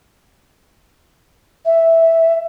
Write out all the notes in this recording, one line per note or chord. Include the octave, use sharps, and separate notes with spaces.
E5